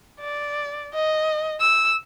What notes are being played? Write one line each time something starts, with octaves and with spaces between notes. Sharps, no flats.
D5
D#5
E6